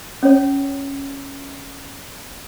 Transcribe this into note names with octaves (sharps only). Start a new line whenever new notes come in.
C#4 C#5